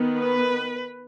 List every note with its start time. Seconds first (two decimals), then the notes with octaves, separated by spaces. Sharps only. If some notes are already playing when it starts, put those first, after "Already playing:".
Already playing: D#3 B3
0.19 B4